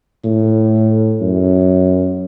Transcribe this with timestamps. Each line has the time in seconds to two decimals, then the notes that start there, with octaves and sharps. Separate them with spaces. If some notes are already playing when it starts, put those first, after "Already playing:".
0.24 A2
1.21 F#2